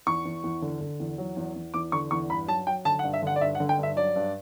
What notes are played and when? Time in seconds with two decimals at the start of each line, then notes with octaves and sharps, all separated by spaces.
0.06 E2 C#6
0.25 E2
0.44 E2
0.62 D3
0.81 D3
1.00 E2
1.18 F#3
1.37 E2
1.56 E2
1.74 E2 D6
1.92 D3 C#6
2.11 E2 C#6
2.29 G2 B5
2.48 F#3 A5
2.67 F#3 G5
2.85 D3 A5
2.99 F#5
3.04 G2
3.14 E5
3.22 D3 F#5
3.36 D5
3.41 G2 E5
3.55 F#5
3.60 D3
3.69 G5
3.78 G2 E5
3.96 F#3 D5
4.16 G2